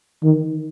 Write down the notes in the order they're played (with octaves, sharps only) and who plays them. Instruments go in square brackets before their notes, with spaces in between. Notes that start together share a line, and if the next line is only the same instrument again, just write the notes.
[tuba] D#3